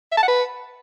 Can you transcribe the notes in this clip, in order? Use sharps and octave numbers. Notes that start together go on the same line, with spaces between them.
E5
A5
F#5
B4